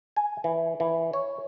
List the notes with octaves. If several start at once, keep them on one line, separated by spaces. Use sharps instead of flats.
G#5
E3
E3
C#5